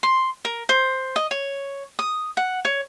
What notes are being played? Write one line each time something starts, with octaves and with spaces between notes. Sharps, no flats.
C6
A#4
C5
D#5
C#5
D#6
F#5
C#5